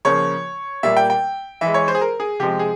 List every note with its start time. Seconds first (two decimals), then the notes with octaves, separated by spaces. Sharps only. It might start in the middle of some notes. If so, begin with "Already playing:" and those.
0.05 C#3 F3 A#3 C#5
0.83 A#2 G3 A#3 E5
0.97 G5
1.10 G5
1.61 E3 G#3 E5
1.74 C#5
1.88 C5
1.95 G#4
2.01 A#4
2.20 G#4
2.40 C3 F3 G#3 G4
2.59 G#4